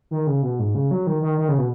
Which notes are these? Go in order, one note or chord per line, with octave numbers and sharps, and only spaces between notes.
D#3
C#3
B2
G#2
C#3
F#3
D#3
D#3
D#3
C#3
B2